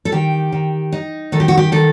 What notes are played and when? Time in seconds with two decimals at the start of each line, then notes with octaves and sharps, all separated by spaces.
0.05 A4
0.12 D#3 G4
0.52 D#3
0.92 D#4
1.32 D#3 A4
1.40 G4
1.48 F#4
1.57 G4
1.72 D#3 A4